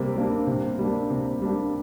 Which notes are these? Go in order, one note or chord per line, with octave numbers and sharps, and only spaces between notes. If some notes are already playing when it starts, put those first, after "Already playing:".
Already playing: C3 G3 A#3
G3 A#3 D4
C3
G3 A#3 D4
C3
G3 A#3 D4